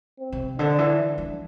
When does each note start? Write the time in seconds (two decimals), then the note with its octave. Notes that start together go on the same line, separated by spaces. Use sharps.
0.20 C4
0.32 C3
0.59 D3 D4
0.78 E3
1.18 E3